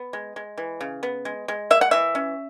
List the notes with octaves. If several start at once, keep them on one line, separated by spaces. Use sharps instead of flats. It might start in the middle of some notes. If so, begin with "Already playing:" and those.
Already playing: B3
G#3
G#3
E3
C#3
B3
G#3
G#3
A#3 E5
F#5
E3 E5
C#4